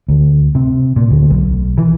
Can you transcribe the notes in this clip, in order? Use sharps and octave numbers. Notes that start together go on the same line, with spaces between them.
D2
C3
A#2
D2
B1
E3